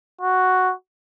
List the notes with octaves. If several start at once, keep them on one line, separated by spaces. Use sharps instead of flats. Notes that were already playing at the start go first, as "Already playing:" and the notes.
F#4